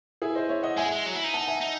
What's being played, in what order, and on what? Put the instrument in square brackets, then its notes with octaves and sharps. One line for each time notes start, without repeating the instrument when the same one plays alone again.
[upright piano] E4 G#4
C5 D#5
C#5 E5
D#5 F#5
[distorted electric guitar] G#3 [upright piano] E5 G#5
[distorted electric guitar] G#3
F#3
E4
D#4
[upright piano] F#5 A5
E5 G#5
[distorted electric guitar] D#4